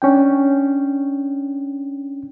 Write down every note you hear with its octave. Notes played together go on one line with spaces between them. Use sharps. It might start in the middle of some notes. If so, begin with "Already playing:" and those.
C#4 D4 G5